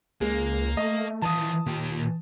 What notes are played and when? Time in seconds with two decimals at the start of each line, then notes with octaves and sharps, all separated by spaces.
0.21 C#2 G#3 A#3
0.77 A3 D#5
1.22 D#3 E3 F4 A5 D#6
1.66 D#2 A#2 G4